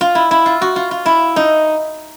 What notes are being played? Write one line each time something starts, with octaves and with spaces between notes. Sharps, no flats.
F4
E4
E4
F4
F#4
F4
F4
E4
D#4